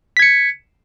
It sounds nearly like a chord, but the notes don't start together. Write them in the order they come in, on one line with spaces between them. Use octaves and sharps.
B6 G#6 C#7